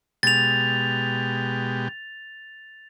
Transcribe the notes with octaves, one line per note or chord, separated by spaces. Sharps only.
B2 G#3 G4 A6 F7